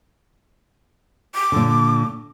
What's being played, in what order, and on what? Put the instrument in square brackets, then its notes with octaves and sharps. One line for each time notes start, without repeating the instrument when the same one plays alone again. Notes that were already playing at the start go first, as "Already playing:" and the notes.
[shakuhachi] D6
[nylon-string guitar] A#2 D3